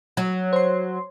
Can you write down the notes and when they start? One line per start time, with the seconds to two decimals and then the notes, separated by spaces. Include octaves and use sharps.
0.17 F#3
0.53 C5 C6